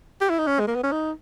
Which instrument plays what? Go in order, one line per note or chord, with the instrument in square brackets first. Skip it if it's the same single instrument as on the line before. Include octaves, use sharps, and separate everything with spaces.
[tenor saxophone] G4
E4
D#4
C#4
G#3
A#3
B3
C#4
D#4